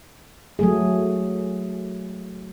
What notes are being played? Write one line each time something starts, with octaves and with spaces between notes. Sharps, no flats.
F#3 A3 G#4